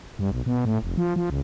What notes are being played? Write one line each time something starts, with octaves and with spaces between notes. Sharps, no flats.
G2
B1
B2
A2
F1
F3
F3
C#2